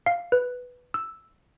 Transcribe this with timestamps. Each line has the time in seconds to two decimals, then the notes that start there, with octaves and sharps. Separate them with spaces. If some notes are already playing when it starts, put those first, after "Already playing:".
0.06 F5
0.32 B4
0.94 E6